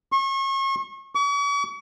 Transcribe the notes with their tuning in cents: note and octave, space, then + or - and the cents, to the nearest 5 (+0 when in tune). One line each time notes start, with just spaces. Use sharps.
C#6 -35
C#6 +45